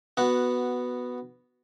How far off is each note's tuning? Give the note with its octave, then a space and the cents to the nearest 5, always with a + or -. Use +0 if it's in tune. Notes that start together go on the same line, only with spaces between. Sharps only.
B3 +0 F#4 +0 F#5 -5